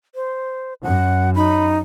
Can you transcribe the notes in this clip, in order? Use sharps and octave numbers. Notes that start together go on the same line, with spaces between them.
C5
F#2 F#5
D#4 B5